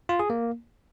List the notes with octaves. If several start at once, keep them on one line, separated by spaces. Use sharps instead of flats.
F4
G#4
A#3